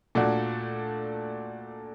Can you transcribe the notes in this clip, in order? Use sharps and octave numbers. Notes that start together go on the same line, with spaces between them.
A#2 A3 D4 F#4